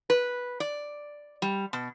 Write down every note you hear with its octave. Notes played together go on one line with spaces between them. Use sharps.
B4
D5
G3
B2